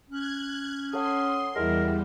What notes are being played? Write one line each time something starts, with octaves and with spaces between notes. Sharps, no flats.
C#4 F#6 G#6
A4 C#5 F#5 C6 D#6
E2 G3 G#3 E4 A#4